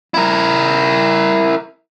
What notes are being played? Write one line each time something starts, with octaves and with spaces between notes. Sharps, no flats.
E4 A#4